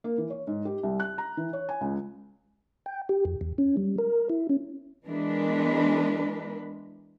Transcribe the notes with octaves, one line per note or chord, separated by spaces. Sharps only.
A#3
E3
C#5
G#2
G4
C2
F#6
A#5
E3
C#5
G#5
C#2
G5
G4
F2
E2
C#4
G3
A#4
E4
C#4
E3 G#3 B3 D4 A#4 B4